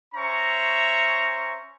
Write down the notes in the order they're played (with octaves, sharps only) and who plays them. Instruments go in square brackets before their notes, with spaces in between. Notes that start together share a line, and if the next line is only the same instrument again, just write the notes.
[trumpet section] C#4 C5 E5 A#5 C#6